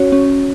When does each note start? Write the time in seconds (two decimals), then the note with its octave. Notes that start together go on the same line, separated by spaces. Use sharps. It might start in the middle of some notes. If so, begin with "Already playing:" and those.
Already playing: C#4 F#4 C#5
0.12 C#4